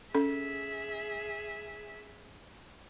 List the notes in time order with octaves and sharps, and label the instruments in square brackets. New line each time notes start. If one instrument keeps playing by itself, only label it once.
[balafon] C#4 A4 [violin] G#4 E5